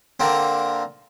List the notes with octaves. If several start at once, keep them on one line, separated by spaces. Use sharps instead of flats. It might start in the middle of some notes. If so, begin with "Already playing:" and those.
D3 A#3 C4